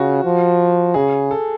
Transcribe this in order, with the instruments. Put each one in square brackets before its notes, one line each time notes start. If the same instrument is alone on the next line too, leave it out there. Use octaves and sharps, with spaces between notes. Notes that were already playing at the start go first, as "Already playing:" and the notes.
Already playing: [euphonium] C#3 [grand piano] F4 F#4
[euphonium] F3
[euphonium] C#3 [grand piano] G#4
[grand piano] A4